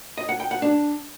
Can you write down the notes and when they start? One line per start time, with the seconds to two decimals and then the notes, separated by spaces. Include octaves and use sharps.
0.18 D#5
0.29 F#5
0.40 G5
0.51 F#5
0.62 D4